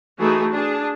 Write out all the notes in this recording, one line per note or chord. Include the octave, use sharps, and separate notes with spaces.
E3 A3 D#4 F#4 G#4
D4 G#4 A5